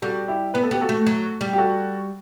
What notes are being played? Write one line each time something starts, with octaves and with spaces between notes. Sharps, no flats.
G3 F#4 A4
E4 G4
B3 B4
A4
B3 G4
F#4 A4
A3
F#3
G3
G4
F#4 A4